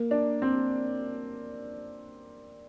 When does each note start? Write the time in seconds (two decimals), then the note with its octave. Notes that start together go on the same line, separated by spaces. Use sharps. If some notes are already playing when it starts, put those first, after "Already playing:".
Already playing: A#3
0.11 D4
0.42 C4